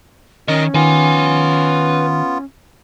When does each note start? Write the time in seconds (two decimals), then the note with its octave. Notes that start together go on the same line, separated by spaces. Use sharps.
0.48 D#3 C#4 A#4 D#5
0.74 D#3 B3 F4 B4 G#5